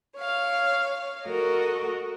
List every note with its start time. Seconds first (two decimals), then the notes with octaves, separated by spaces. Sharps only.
0.16 C#5 F5
1.23 F#4 A4 A#4 D#5